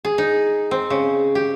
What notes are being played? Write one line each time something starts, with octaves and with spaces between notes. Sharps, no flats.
G#4
D#4
C4
C#3
G4